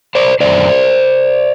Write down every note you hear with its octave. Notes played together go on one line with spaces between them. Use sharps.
C5 D5
F#2 D3 C5 D5